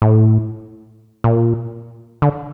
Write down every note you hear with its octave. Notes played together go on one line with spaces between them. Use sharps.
A2
A#2
D3